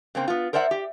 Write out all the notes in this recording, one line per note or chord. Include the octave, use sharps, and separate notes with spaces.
C#3 A#3 C4
B3 F4
A#4 C5 D5 E5 F#5
G4